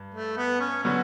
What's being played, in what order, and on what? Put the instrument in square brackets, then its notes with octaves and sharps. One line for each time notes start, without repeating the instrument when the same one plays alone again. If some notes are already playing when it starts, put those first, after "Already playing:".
Already playing: [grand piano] G2
[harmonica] A3
B3
C#4
[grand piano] D3 F#3 B3 F#4 [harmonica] C#4